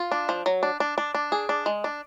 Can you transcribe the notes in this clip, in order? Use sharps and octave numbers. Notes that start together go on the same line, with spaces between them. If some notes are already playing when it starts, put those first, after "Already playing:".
Already playing: F4
D4
F3
F#3
D4
D4
D4
D4
G#4
D4
G#3
D4